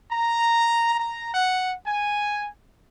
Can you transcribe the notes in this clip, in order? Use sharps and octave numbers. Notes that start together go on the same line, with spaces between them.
A#5
A#5
F#5
G#5